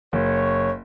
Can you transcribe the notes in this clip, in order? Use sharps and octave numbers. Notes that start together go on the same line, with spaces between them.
F#1 C#5